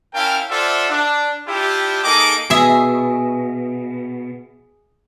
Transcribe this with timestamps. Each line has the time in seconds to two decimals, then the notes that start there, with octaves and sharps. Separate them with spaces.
0.14 C#4 E4 A#4 F5 G5 A5
0.50 F4 A4 C5 D5 E5 F#5
0.89 D4
1.48 D4 E4 F4 G4
2.04 A#3 D#4 G#4 A4 D#5 D6
2.50 B2 G#4 E5